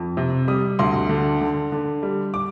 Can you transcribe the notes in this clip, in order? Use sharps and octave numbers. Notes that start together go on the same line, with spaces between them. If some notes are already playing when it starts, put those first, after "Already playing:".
Already playing: F2
C3
G3 D#6
D2 C6
D3
D3
D3
G3
D6